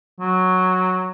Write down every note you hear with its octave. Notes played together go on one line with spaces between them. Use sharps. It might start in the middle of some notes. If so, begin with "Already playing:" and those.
F#3